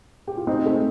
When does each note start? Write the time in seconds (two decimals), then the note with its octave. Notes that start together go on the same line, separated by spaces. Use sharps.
0.27 G4
0.37 F4
0.47 C4 D#4
0.66 A3 C4